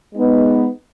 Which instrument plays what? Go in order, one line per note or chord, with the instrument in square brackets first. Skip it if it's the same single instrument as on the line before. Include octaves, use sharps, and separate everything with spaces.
[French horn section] G#3 B3 D#4